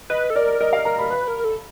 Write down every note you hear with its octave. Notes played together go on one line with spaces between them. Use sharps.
B4 D#5
A4
A#4 D5
A#4 D#5
F5
A#4 A#5
B5
B4 B5
A#4
A4